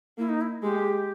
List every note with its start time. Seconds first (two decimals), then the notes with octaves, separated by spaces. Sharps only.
0.18 A#3 E4
0.29 D#4
0.41 E4
0.62 G#3 G4